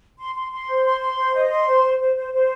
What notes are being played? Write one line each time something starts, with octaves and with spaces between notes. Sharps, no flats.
C6
C6
C6
C5
C6
C6
C5
D#5
C6
C5
C5
C5
C5
C5